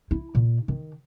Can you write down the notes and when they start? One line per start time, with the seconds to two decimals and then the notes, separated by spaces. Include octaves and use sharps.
0.11 E4
0.35 A#2
0.68 D#3